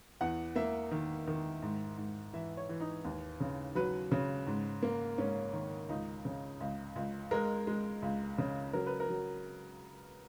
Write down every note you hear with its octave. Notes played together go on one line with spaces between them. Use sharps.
E2 F#5
A#3 E5
D#3
D#3
G#2
G#2
E3 E5
C#5
E3
D#4
D#2
C#3
F#3 B4
C#3
G#2
A#3
G#2 C#4
D#3
C#2 D#4
C#3
C#2
C#2
G#3 A#4
G#3
C#2
C#3
F#3 A#4
B4
A#4
F#3